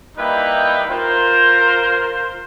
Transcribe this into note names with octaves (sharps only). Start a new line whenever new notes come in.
G3 A#3 D#4 E4 B4 G5
F4 A#4 C5